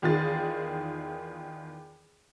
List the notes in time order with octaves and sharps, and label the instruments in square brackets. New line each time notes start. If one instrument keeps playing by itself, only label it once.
[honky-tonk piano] E2 D#3 F4 G#4 A6